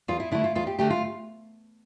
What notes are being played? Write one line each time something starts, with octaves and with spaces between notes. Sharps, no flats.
E2 F4
E4
D3 A3 E4
F4
E2 F4
G4
D3 A3 G4
F4